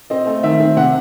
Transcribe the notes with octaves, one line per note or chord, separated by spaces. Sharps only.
C4 D#5
A3
D#3 E5
C4
C3 F#5